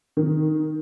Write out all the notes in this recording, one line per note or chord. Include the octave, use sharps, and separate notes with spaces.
D#3